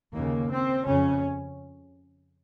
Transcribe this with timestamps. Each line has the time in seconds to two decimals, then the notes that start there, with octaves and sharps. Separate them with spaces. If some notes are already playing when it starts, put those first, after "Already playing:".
0.13 D#2 C#3 A#3
0.50 C4
0.86 F2 C#3 C#4